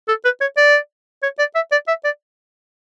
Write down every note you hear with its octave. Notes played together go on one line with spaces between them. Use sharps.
A4
B4
C#5
D5
C#5
D5
E5
D5
E5
D5